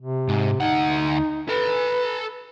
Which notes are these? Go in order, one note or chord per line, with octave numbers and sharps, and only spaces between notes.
C3
G#2
D2 D#4 F#5
A4 B4 A#5